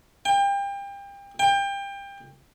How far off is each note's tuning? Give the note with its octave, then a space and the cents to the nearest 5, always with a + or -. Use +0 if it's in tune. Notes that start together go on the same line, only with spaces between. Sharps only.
G5 +30
G5 +25